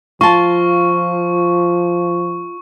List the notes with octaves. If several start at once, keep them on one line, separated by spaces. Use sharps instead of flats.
F3 F4 A5 C#6